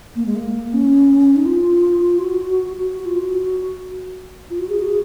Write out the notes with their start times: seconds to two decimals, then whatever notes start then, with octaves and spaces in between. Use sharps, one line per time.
0.16 A#3
0.26 G#3
0.35 A#3
0.74 C#4
1.36 D#4
1.46 F4
2.19 F#4
2.77 F#4
2.99 F#4
3.06 F4
3.20 F#4
4.50 F4
4.59 F#4
4.69 G#4
4.79 F#4
4.88 G#4